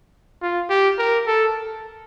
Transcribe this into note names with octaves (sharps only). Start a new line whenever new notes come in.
F4
G4
A#4
A4